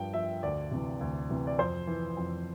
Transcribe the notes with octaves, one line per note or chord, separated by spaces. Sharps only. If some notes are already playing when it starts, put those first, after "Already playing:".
Already playing: G2 F3 G5
F3 E5
D2 D5
C3 E3
D2
C3 E3
D5
F2 C5
E3
F2